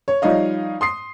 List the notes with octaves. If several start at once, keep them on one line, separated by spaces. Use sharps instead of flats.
C#5
F3 G3 D#4 C#5 D#5 F5
C6 D#6 C7